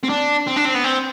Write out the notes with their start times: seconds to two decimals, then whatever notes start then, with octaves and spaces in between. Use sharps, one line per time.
0.03 C4
0.09 D4
0.47 C4
0.56 D4
0.65 C4
0.74 B3
0.84 C4